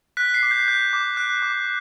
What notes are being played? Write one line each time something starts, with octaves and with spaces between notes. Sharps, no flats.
F#6 B6
C7
D6
G6
F#6 G6
D6
F#6
D6